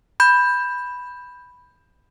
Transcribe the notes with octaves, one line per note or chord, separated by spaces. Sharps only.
B5 G6